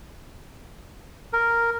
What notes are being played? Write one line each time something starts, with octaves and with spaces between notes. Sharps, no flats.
A#4